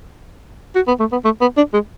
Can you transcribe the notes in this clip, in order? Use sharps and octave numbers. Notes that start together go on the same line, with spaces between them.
F#4
B3
A3
B3
A3
B3
D4
G#3